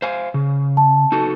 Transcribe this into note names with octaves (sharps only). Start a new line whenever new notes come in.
C5 F5 G#5
C#3
A5
D#4 F#4 A4